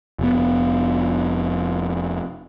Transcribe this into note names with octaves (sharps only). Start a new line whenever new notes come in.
F1 B3